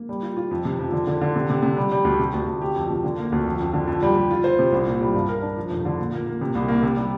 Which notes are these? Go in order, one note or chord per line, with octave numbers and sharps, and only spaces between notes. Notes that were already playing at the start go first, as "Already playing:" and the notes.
Already playing: A#3
G3
F4
F4
F2
C3
F2
D3
D3
D3
C3
C3
C3
G3
G3
D2
C3
D2
D2
G4
F2
C3
D3
A#3
D2
F2
F2
D3
F2
G3
G3
F4
C5
C3
C2
A#2
G3
G2
A#4
D4
F3
F1
D3
A#2
A#3
A#3
C3
C2
A#3
C3
G3